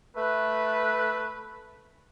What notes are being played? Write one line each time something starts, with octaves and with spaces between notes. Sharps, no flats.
A3 B4